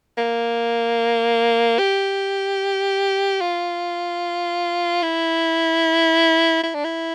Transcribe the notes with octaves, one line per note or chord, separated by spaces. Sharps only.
A#3
G4
F4
E4
E4
D4
E4